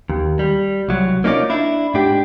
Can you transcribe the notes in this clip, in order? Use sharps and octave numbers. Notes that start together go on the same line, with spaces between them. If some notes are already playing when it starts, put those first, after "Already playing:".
D#2
G3
C2 F#3
A#3 C#4 D#4 F4 G#4 D5
D4 E4
G#2 D4 G4